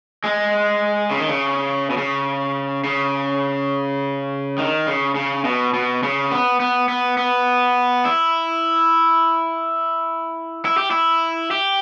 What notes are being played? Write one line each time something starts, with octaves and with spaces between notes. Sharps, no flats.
G#3
C#3
D#3
C#3
B2
C#3
C#3
D#3
C#3
C#3
B2
B2
C#3
B3
B3
B3
B3
E4
E4
G4
E4
G4